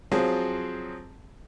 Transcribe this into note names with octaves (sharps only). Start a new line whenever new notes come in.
F3 F#3 C4 F4 G#4